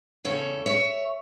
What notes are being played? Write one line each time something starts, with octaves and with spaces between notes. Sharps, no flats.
E2 C#3 G3 A4 C#5
C#5 E5